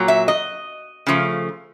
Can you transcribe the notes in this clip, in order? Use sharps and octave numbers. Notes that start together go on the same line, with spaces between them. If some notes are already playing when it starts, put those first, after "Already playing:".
Already playing: A#2 F#3
E5
D#5
C#3 F3 A3